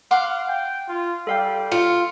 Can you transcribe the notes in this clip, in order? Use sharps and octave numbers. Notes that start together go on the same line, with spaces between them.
F5 F#5 C6 D6
G5
F4
G3 A4 F5 G5
F4 C#7